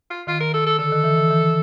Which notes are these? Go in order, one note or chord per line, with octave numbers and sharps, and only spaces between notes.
F4
D#3 F4
A#4
A4
A4
D3 A4
D#3
E3
E3
E3